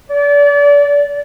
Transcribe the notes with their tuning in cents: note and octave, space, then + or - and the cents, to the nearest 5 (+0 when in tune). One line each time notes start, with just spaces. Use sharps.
D5 -35